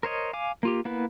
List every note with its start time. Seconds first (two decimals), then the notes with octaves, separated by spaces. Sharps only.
0.03 A#4 C5 C#5 D#5
0.33 F5 G#5 D6
0.63 A#3 F4 G4
0.85 A#3 B3 E4 B4